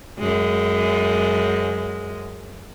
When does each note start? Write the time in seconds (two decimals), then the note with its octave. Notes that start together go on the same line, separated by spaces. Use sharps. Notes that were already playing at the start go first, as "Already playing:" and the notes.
0.19 F#2 G#3